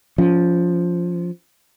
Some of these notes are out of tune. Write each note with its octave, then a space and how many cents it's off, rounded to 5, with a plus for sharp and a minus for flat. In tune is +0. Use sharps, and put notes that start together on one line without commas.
F3 +0 C#4 +30